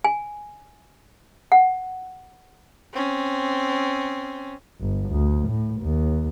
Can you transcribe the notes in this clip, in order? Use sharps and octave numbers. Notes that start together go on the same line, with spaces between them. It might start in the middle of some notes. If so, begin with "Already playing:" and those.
G#5
F#5
C4 C#4
G1
D2
A2
D#2